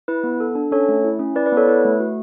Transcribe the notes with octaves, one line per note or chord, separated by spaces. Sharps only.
E4 B4
B3
A4
D4
C#4 A4 C#5
A3
E4
C#4
E4 B4 D5
B4 D5
B3 A4 C#5
E4 B4
A3
F#4